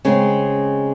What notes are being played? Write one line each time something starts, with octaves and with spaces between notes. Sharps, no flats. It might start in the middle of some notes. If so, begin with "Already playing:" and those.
C#3 G#3 C4 C#4